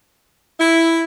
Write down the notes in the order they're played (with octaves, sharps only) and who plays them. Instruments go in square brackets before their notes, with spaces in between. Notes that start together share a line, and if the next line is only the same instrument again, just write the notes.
[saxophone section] E4